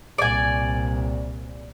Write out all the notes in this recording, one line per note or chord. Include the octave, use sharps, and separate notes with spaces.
C2 A#2 D5 G#5